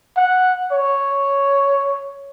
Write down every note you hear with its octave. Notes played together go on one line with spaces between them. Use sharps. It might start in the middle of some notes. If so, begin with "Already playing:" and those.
F#5
C#5